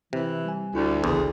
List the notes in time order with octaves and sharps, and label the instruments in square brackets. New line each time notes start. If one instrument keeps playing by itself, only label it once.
[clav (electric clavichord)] C3 [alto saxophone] E3
[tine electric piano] G3 G#5
[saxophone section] D2 [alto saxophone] G3 [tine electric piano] E4
[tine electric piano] A1 C#3 C6 [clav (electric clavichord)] E2 [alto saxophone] G#4